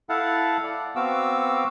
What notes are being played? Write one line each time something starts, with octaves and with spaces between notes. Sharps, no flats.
E4 A4 F5 F#5 A5
D5
B3 C4 F#4 F5 D6 E6